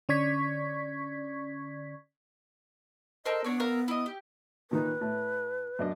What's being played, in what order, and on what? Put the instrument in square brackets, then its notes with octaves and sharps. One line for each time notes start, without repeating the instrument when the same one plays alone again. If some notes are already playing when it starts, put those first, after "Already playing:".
[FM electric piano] D3 C#4 D5 C#6 G#6 B6
[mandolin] A4 A#4 C5 [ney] D#5
[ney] B3 [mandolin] D4 C#5 D5
[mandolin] A#4 E5 F5
E4 D#5
G4
[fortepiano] A#2 D#3 D#4 [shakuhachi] B4
[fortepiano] A2
F#2 D4 D#5